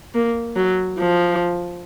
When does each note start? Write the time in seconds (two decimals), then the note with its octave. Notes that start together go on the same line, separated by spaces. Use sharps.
0.14 A#3
0.57 F#3
0.99 F3